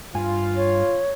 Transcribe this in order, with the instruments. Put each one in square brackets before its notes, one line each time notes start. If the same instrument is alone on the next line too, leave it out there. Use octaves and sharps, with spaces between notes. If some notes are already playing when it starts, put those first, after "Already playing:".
[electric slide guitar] G2 G#5 [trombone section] F4
[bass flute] C#5